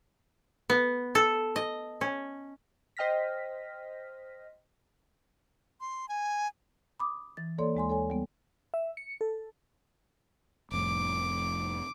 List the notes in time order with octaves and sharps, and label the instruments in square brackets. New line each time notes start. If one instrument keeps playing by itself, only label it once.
[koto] B3
A4
D#5
C#4
[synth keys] C5 D#5 G5 F6 A#6 B6
[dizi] C6
G#5
[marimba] B5 D6 D#6
E3 A6
E3 A#3 A4 C#5 D5 C6
D#2 G#3 G#5 C6
A4 C#5 G#5
G3 B3
[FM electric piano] E5
C#7
A4
[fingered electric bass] F1 F2 A2 [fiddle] D6